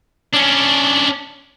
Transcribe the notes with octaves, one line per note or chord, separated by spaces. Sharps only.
C#4 D4